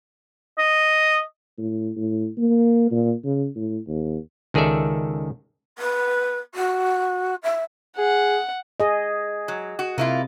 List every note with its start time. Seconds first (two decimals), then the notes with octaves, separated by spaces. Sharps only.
0.58 D#5
1.58 A2
1.96 A2
2.37 A#3
2.91 A#2
3.24 C#3
3.56 A2
3.87 D#2
4.54 C#2 D#3 G#4 A4 D5 E5
5.78 B4
6.54 F#4
7.43 E5
7.98 G#4 F#5
8.80 G#4 D#5
9.48 F#3
9.79 F#4
9.98 C3 A#3 E4 F4